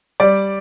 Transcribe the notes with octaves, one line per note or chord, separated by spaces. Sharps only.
G3 D5